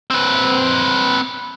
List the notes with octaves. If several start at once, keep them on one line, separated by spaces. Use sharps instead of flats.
C4 B4